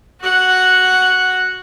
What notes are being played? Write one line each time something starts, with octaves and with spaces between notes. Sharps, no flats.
F#4 F#5